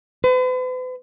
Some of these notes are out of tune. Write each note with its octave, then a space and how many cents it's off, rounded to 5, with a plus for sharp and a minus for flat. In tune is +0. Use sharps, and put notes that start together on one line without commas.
B4 +45